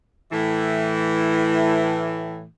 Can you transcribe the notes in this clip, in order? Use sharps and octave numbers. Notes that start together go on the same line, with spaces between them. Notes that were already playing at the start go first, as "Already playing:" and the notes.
A2 E3